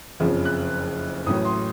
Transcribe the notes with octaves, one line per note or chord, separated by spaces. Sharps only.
F#1 F2 C#3 F3
F#6
A1 A2 F#3 D#6
C6